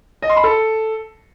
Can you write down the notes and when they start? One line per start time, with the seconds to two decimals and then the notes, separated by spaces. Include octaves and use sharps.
0.22 D#5
0.29 C6
0.37 B5
0.44 A4